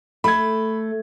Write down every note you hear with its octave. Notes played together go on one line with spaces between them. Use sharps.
A3 B5 G#6